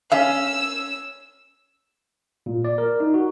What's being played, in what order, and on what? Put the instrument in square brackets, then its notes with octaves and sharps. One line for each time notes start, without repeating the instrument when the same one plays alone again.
[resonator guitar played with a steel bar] C#4 [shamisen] F5 [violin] E6
[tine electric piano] A#2
D5
A#4
D#4
F#4